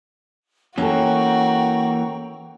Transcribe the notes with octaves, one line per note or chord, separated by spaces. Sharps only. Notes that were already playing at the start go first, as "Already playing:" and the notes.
E3 A#3 C#4 F#4 A4 G5 A#5 C#6